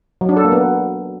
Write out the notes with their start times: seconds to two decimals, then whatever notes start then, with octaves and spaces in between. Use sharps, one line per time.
0.21 F#3
0.29 D4
0.37 A4
0.44 A#3
0.52 B3